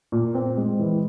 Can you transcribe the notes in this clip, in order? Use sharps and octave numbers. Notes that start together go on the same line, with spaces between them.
A#2
C4
G#3
E3